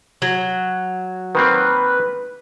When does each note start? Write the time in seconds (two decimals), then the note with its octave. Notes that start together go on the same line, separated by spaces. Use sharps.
0.22 F#3
1.35 D#3 A#3 C4 B4